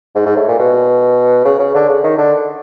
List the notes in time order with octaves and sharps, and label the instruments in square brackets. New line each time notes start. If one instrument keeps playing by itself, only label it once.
[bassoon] G#2
G#2
A2
A#2
B2
C#3
C#3
D3
C#3
D#3
D3